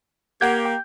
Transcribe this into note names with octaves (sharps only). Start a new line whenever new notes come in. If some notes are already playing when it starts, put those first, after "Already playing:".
A#3 G4 F#5 G6 G#6
G5